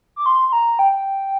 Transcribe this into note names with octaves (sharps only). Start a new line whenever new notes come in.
D6
C6
C6
A#5
G5